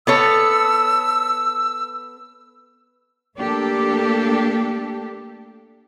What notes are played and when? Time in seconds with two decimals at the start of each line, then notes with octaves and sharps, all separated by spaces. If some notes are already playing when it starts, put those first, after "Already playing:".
0.07 B3 A4 C#5 E6
3.37 A3 A#3 D4 G4 A4